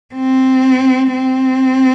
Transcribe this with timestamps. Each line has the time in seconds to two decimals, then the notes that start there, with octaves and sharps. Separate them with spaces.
0.15 C4
1.13 C4